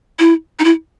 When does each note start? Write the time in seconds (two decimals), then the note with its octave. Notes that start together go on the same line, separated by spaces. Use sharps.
0.19 E4
0.59 D#4
0.64 E4